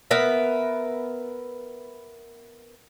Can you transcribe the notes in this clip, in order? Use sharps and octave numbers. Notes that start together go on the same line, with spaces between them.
B3 A#4 B4 E5